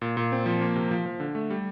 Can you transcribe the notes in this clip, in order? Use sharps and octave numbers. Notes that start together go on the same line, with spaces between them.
A#2
A#2
C4
F3
A#3
C3
F3
F3
D3
A3
G3